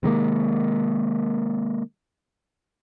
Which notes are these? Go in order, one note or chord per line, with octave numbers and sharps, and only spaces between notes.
C3 D#3 G#3 A#3